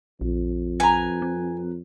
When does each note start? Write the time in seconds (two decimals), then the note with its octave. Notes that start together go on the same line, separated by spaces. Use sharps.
0.21 A#1 F2
0.80 B4 G#5 A#5
1.22 C4